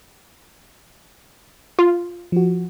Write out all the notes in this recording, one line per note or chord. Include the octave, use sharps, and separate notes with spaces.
F4
F3 F#4